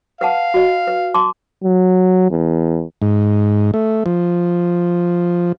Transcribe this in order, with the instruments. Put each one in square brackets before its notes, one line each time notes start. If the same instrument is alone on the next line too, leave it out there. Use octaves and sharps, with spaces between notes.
[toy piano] B4 F#5 A5 [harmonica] F5
[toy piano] F#4 D#5
B4
A5 C6 D6
[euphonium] F#3
E2
[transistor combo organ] G#2
A3
F3